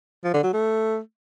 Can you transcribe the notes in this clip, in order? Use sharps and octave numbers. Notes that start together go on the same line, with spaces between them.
F3
D3
F#3
A3